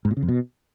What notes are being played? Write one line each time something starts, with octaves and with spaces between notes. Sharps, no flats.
G#2
A#2
C#3
F2
B2